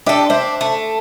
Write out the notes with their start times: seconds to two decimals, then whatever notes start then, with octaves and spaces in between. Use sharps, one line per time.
0.06 D4 G4 A4 D#5 E5
0.30 D4 C5 E5
0.61 A3